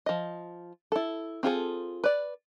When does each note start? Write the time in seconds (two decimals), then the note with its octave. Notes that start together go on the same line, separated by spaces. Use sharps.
0.06 F3 D#5
0.92 E4 A4
1.43 C4 F4 G#4 A4
2.04 B4 D5